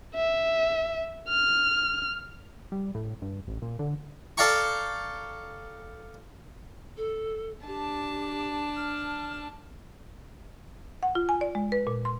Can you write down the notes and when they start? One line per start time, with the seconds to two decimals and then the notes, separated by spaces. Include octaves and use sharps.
0.15 E5
1.28 F6
2.72 G3
2.95 A2
3.22 G2
3.48 A1
3.62 A#2
3.79 D3
4.37 A4 D5 F5 G5 A#5 C#6
6.97 A4
7.67 D4 G4 A5
8.76 F6
11.03 F#5
11.15 F4
11.29 G#5
11.41 D5
11.55 G#3
11.72 B4
11.87 A#2
12.05 C6